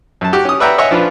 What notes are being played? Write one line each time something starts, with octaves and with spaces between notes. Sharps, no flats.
F#2 A5
F#4 G4
C#4 D#6
B4 D5 E5 F#5 G5 A#5
C#5 D#5 E5 F#5 G#5 C#6
F3 D4 F4 B4